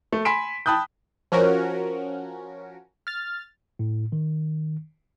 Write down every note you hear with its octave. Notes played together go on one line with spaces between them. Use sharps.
A3
G#5 B5 C6 B6 D7 E7
G5 A5 B5 D#6 F#6 G6
F3 C#4 F#4 A#4
F6 A6
A2
D#3